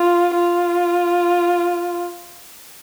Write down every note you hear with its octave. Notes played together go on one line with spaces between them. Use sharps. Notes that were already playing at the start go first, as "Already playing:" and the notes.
Already playing: F4
F4